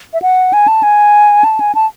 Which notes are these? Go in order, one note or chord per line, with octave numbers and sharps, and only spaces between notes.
E5
F#5
G#5
A5
G#5
A5
G#5
A5